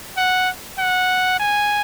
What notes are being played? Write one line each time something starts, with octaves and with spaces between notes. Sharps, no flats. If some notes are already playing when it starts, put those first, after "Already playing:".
F#5
F#5
G#5